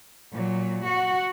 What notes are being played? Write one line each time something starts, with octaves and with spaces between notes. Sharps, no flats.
A#2 F#3
F#4 F#5